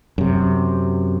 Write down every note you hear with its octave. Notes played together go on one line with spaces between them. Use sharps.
F#2 C3